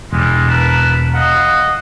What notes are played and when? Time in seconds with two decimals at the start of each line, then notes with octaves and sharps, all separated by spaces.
0.13 E1 G3 G#3
0.49 A#4 B4 A5
1.14 D#5 F5 F#5